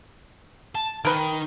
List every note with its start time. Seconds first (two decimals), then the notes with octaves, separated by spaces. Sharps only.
0.75 A5
1.05 D#3 A#4 B4